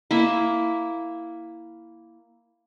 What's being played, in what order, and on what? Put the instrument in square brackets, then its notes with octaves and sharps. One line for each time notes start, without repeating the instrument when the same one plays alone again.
[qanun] A#3 E4 E5